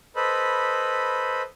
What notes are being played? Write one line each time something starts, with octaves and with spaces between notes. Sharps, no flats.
A4 B4 C5 D#5 B5